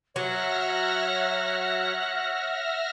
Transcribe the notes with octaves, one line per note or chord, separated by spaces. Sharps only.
F#3 C#5 E5 F#5 F6 A#6